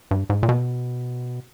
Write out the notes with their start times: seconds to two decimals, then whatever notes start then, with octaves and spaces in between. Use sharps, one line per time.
0.11 G2
0.30 G#2
0.43 A#2
0.49 B2